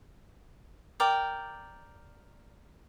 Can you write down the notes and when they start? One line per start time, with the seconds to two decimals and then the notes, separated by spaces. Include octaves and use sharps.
1.00 A#4 D5 G5